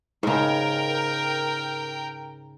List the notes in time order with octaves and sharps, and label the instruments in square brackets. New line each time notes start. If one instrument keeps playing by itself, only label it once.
[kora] G#2 C#3 [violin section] A#4 G5